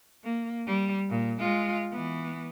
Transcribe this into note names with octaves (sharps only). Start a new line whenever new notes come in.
A#3
G3
A#2
G#3 F4
E3 B3